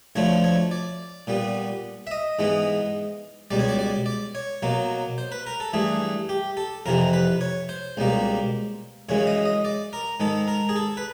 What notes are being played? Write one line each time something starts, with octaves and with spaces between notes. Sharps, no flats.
D2 D3 F3 A3 C#5
C#5
D5
A#2 G3 B3
E5
D#5
G#2 E3 G#3 B3
C#2 B2 G3 D5
C#5
D5
D5
D5
C#5
B2 F#3 A#3
C5
B4
A#4
A4
G2 E3 A3 G#4
G4
A4
F2 C3 E3 A#4
B4
C#5
C5
C#2 B2 G3 A#3
F#2 C#3 E3 G#3 C#5
D#5
D#5
D5
A#4
G#2 D#3 G#3 A4
A#4
G#4
A4
B4